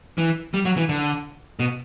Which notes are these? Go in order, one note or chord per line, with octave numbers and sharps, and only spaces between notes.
E3
G3
F#3
E3
D3
B2